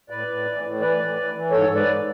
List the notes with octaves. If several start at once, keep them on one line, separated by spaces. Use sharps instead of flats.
A2 B4 D5
A2
E3
A2
E3 B4 D5
A2
E3
E3
G#2 A4 C#5
G#2
B4 D5
G#2